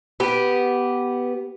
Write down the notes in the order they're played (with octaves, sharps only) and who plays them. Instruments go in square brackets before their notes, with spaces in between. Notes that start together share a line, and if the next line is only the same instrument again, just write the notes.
[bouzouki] B3 G4